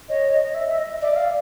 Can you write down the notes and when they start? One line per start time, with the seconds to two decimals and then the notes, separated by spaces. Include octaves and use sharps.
0.09 C#5 D#5
0.32 D#5
0.44 D#5
0.55 E5
0.68 E5
0.78 D#5
1.01 D5 E5
1.12 E5
1.16 F5